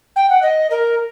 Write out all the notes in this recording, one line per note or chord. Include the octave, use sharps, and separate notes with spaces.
G5
F#5
D#5
A#4